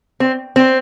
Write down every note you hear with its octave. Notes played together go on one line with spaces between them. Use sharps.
C4
C4